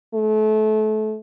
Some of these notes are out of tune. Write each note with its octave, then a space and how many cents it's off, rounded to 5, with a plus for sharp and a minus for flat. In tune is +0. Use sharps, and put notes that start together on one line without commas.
A3 -30